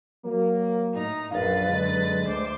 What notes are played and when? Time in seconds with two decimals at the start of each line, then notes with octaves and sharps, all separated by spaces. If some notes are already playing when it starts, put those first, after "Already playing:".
0.24 F#3 A#3
0.91 A2 D#4 A#5
1.32 A#1 F#2 B4 F5 A6
1.68 D3 G#3
2.25 D2 C5 D6